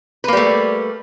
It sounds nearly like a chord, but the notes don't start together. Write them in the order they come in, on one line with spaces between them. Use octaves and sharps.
B4 A#3 G3 A3